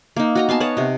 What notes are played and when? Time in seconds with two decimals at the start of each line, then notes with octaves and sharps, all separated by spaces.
0.16 A#3 D#4
0.35 F#4 D#5 A#5
0.49 B3 F5 G#5 A5
0.60 B4 C#5 F#5 A5
0.77 C3 D#5